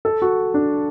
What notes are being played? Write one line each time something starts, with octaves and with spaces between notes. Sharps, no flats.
A4
F#4
D4